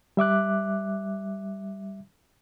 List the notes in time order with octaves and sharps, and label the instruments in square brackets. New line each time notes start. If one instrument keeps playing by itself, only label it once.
[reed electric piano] G3 E5 D6 F#6